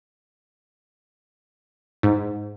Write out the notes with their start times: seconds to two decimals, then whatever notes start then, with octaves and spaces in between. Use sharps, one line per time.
2.03 G#2